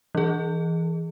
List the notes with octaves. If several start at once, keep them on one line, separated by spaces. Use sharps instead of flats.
E3 G#4